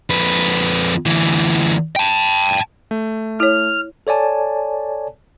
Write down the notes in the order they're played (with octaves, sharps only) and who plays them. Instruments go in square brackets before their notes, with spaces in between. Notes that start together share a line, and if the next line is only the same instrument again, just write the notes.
[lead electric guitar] F2 B4
D2 E3
G5 A5
[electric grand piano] A3
[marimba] E4 C#5 [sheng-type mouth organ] F6
[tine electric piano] A4 C#5 D5 G#5 A5